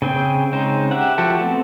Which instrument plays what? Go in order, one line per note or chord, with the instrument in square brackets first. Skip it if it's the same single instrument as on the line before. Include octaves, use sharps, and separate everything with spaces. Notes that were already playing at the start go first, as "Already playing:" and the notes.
[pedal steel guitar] C#3 C4 G#4 G5
C#3 G#3 C4 D#4 C5
G4 E5 F#5
F3 F#4 G4 A4
A3 B3 C4